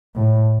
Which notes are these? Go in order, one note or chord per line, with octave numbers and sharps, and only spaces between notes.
A2